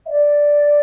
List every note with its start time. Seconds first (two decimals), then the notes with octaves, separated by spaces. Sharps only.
0.06 E5
0.10 D5